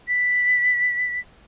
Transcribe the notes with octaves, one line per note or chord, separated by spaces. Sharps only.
B6